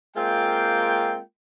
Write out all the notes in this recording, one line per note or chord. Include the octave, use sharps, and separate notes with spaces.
G#3 A#3 C4 F4 G5